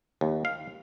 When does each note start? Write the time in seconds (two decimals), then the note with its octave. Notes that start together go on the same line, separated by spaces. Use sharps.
0.21 D#2
0.45 F5